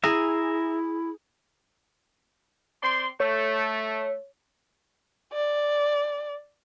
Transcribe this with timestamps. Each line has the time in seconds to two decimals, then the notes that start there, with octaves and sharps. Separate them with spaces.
0.04 E4 G#4 E5 A#5
2.83 C4 D5 C6
3.20 A3 C#5
5.33 D5